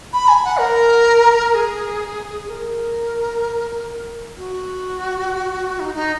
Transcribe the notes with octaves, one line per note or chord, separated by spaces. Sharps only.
B5
G#5
F#5
A#4
G#4
A#4
F#4
D#4
D#4